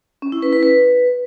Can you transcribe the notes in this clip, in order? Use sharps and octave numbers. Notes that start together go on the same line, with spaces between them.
C#4
E4
B4
B4
B4